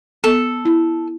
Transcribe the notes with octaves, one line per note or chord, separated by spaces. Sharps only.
B3 A4
E4